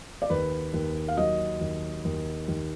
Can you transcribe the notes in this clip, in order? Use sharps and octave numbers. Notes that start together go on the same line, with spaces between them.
D5
D#2 B4
D#2
F5
F#3 D#5
D#2
D#2
D#2